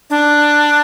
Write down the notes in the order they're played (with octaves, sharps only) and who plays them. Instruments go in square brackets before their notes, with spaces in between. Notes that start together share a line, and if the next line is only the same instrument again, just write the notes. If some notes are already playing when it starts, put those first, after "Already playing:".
[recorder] D4